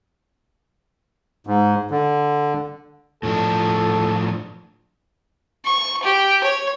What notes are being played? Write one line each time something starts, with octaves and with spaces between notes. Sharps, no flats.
G#2
D3
A2 F3 D4 A4
C#6
G4
C#5